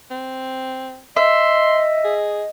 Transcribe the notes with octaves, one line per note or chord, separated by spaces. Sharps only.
C4
D#5 E5 C6
G#4